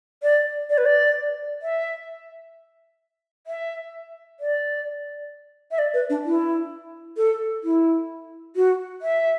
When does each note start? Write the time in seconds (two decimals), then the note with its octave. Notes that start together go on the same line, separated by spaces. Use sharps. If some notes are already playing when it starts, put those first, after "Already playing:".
0.23 D5
0.70 D5
0.78 B4
0.85 D5
1.62 E5
3.47 E5
4.40 D5
5.71 E5
5.78 D5
5.94 B4
6.10 D4
6.25 E4
7.17 A4
7.64 E4
8.56 F#4
9.02 E5